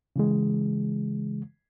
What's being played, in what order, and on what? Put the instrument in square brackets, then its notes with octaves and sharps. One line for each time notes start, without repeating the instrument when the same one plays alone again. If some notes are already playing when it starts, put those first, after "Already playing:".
[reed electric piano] C#3 E3 G#3